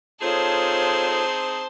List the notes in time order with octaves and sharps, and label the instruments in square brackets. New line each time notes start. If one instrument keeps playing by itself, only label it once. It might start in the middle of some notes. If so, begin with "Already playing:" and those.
[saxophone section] C4 D#4 G#4 [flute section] F4 A4 C#5 [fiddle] C5 A5